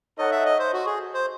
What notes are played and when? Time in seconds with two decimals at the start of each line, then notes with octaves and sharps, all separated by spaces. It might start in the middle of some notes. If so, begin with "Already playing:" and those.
0.18 D#4 A4 C#5 D#5 F#5
0.31 E5
0.46 D#5
0.59 C5
0.73 F#4
0.86 G#4
1.14 C5